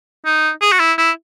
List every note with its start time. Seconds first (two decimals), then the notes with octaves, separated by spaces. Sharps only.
0.25 D#4
0.61 G#4
0.72 F#4
0.79 E4
0.98 E4